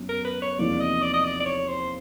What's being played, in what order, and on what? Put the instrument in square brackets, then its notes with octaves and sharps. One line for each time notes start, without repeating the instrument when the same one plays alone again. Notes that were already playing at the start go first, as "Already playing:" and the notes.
Already playing: [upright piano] F#2 F#3 B3
[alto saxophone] A#4
B4
C#5
[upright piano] E2 C3 F3 A#3 D#4 [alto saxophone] D5
[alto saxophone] D#5
D5
D#5
D5
D5
C#5
C5